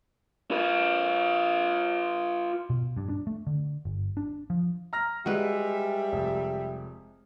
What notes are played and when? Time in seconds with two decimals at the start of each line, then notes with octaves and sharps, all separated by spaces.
0.51 F4 B4
2.70 B2
2.97 G2
3.09 D4
3.27 A3
3.47 D3
3.85 G1
4.17 D4
4.50 F3
4.93 A#5 F6 A#6
5.26 G3 G#3 F#4 B4 E5
6.12 F1